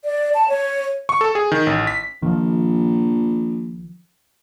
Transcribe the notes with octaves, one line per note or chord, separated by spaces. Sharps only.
D5
A5
C#5
C#6
A4
G#4
D#3
A1
B6
A#1 D#3 F3